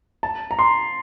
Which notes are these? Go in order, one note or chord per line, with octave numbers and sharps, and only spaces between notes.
A5
A#5
C6